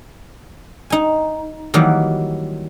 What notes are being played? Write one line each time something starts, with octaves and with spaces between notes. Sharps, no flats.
D#4 G#5
D#3 E3 F#3 G3 A#3